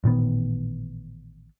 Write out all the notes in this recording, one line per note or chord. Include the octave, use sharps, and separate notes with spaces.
A1 A#2 D#3 B3